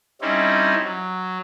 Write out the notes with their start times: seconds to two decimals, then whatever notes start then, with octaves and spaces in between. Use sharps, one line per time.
0.21 G3 C4 C#4 D#4 E4
0.84 F#3